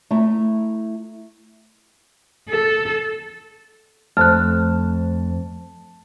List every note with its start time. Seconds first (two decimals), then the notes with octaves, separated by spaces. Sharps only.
0.11 A3 E4 A#5
2.49 A4
4.17 F2 A3 C5 A5 F6 F#6